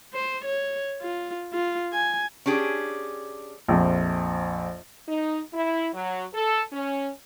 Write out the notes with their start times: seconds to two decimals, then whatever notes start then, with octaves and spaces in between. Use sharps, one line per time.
0.14 C5
0.45 C#5
1.02 F4
1.53 F4
1.93 G#5
2.46 C#4 D4 G4 G#4
3.68 A#1 F2
5.07 D#4
5.53 E4
5.93 F#3
6.33 A4
6.72 C#4